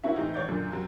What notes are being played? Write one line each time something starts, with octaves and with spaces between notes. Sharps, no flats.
A#3 C4 C#4 E4 F#4 E5
A2 E3 C4 D#4
A1 C#5 D5 G6
F#2 A#2 D3
F#2 F#3 C4